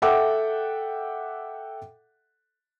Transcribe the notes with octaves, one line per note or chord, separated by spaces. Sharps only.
A4 E5 F#5 G5 D6